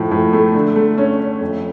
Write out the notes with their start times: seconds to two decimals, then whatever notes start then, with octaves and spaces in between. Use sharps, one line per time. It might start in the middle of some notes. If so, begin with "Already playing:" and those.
Already playing: A2 F3
0.11 A2
0.33 A3
0.54 D3
0.76 A3
0.98 C#4
1.20 C#4
1.41 F2